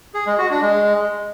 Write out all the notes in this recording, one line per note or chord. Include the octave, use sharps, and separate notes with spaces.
G#4
G#3
F#4
D4
G#3